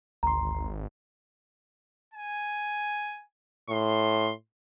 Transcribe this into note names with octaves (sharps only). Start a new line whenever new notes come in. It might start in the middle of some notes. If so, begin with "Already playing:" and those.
G#1 D2 A#5 C6
G#5
A2 C6